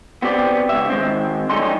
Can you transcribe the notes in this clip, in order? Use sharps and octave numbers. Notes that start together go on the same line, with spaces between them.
B3 C4 G4 D5
C#2 E5
D#3 G#3 C4
F#2 G3 A3 C#4 D#4 C6